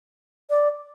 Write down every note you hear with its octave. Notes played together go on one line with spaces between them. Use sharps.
D5